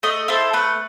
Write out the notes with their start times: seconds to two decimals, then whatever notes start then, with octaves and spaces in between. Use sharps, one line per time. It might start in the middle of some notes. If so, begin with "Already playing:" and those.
0.03 A3 D#5
0.28 E4 A4 C5
0.53 A3 B4